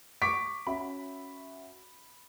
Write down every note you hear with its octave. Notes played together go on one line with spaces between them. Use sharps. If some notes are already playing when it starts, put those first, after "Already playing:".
C#6 D6 B6 D7
C#4 F#4 E5 B5